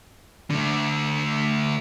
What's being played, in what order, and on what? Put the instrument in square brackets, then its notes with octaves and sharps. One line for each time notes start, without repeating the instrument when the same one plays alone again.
[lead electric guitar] D3 A3